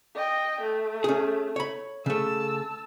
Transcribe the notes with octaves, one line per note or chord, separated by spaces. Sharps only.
D#5 G5
A3
C#4 G#4
C#5 B5
C#3 A3 A5 E6